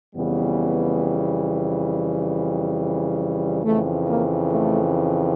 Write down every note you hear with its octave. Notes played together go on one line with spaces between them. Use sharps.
F2 C#3 E3 G3 B3
F2 C#3 E3 A3
A#3
A3